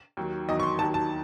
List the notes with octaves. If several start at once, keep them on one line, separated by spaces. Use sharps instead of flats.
D#2 D#3 F#3
E2 D#3 F#3 D#5
C#6
C6
D#2 D#3 F#3 A5
A5